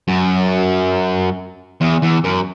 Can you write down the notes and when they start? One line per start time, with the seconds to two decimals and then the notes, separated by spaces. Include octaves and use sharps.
0.08 F#2
1.81 E2
2.02 E2
2.24 F#2